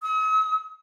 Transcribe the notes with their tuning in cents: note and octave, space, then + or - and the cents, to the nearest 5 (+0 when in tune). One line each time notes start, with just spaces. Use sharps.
D#6 +45